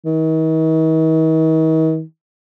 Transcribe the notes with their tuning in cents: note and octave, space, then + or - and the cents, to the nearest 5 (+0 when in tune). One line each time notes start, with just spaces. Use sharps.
D#3 +45